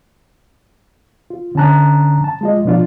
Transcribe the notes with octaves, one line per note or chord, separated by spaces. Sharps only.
F4
D3 C#4 D4 A5 A#5 F#6
A5
G#3 F4 D#5
B2 F3 D4 F4